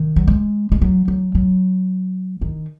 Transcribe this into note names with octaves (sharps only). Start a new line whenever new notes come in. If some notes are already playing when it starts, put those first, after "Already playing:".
Already playing: D#3
F#3
G#3
G#3
F#3
F#3
F#3
D#3